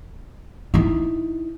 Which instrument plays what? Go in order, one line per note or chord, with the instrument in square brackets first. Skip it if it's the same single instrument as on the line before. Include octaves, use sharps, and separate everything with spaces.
[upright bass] D#4 E4